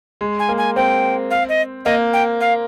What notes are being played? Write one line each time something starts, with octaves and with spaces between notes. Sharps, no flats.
G#3
G#5
A#3
G#5
C4 G5
F5
D#5
A#3 D#5
G5
F5